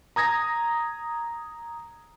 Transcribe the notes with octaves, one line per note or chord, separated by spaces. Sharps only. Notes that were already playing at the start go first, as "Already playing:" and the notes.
A#5 D#6 G#6 A#6